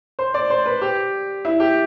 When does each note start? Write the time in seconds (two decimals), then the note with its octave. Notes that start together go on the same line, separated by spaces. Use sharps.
0.19 C5
0.34 D5
0.50 C5
0.66 B4
0.81 G4
1.45 E4
1.60 G4